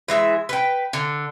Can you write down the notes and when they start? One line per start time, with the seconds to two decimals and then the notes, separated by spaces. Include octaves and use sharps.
0.08 E3 G#3 E5
0.49 B4 G5
0.93 D3